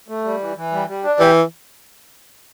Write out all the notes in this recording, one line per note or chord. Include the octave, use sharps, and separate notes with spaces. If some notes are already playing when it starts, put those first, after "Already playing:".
A3
G3
E3
E3
G3
G3
D4
E3 G4